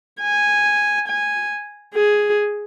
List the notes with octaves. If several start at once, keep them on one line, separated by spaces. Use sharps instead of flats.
G#5
G#5
G#4